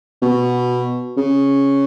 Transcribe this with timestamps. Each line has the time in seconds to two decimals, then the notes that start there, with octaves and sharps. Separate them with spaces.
0.22 B2
1.17 C#3